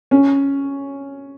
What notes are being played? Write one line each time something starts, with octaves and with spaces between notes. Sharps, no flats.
C#4